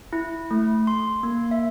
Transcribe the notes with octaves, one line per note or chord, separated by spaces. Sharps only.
E4
A3
C6
A#3
E5